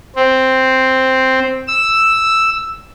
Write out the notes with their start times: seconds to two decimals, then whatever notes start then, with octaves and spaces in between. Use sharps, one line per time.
0.16 C4
1.68 E6